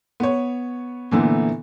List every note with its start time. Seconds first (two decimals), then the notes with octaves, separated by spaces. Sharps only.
0.20 B3 C#5
1.11 A#2 D3 E3 A3 B3